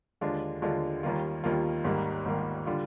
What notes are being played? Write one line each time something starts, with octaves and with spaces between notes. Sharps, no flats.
D#2 D3 G#3 D4 F4
D#2 D3 G#3 D4 F4
D#2 D#3 G3 A#3 F4
D#2 D#3 G3 A#3 F4
G#1 G#2 D#3 G3 A#3
G#1 G#2 D#3 G3 A#3
D3 G3 D4 F4